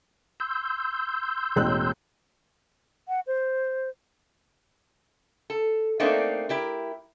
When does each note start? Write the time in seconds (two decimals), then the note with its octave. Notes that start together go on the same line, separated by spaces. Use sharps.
0.40 C6 E6 G6
1.56 E1 A1 F#6
3.08 F#5
3.27 C5
5.50 A4
6.00 A3 A#3 C4 D4 D#4
6.49 E4 G4 A#4